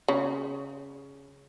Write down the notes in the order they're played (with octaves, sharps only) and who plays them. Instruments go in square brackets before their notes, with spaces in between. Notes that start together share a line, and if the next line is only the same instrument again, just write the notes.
[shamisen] C#3